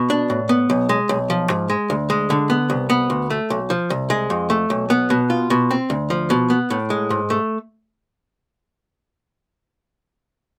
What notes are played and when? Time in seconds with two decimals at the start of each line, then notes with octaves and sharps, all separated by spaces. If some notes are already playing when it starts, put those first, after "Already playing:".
Already playing: B2
0.10 D4
0.30 A2
0.49 B3
0.70 B1
0.89 G#3
1.09 B1
1.30 F3
1.50 G#2
1.70 G#3
1.90 D2
2.10 G#3
2.30 D3
2.50 B3
2.70 C2
2.90 B3
3.10 D2
3.30 A3
3.50 B1
3.70 F3
3.90 C2
4.10 G#3
4.30 F2
4.50 A3
4.70 B1
4.90 B3
5.10 B2
5.30 F4
5.50 B2
5.71 C4
5.90 D2
6.10 F3
6.30 B2
6.50 B3
6.70 A2
6.90 G#3
7.10 G#2
7.30 A3